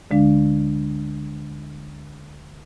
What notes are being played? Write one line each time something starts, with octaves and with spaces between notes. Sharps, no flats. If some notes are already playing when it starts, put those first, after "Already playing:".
D2 D3 G#3 D4 F5